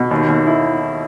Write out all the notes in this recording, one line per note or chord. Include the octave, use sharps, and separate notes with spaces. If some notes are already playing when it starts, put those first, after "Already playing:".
Already playing: B2
D#2
D#2
E4